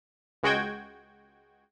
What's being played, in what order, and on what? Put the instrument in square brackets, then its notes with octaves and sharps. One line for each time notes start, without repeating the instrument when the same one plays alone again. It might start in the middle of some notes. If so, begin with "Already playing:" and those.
[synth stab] C#2 G#3 F#4 G5 G#6